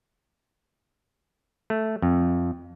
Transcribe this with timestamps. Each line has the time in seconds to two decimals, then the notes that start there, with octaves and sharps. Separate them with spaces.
1.70 A3
2.02 F2